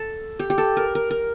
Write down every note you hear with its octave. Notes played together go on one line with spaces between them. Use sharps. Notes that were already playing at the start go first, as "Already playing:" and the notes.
Already playing: A4
G4
G4
A4
A#4
A#4
A#4